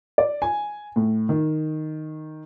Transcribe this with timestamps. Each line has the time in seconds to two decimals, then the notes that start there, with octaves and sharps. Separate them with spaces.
0.18 D5
0.42 G#5
0.96 A2
1.29 D#3